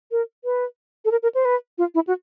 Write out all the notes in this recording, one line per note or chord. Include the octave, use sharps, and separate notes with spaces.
A#4
B4
A4
A#4
A#4
C5
B4
F4
E4
F#4